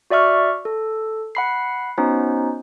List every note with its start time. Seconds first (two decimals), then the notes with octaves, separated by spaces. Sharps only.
0.10 F#4 D5 E5 C#6 F6
0.65 A4
1.35 F#5 B5 C7
1.98 B3 C#4 D#4 F#4 C5